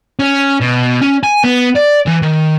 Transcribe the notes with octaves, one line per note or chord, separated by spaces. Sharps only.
C#4
B2
C#4
G#5
B3
D5
E3
D#3